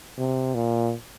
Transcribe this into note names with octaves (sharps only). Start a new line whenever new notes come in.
C3
A#2